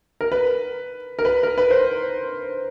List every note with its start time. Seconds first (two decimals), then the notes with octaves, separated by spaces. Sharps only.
0.21 A#4
0.32 B4
1.19 A#4
1.25 B4
1.43 A#4
1.58 B4
1.70 C5